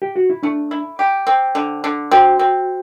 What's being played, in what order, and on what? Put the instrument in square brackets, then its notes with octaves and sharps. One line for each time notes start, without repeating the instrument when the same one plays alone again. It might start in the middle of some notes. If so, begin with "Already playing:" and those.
[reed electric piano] G4
F#4
E4
[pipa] A3 [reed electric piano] D4
[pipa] E4
G4
C4
D3
D3
[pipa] C4 [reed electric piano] F#4
[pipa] C4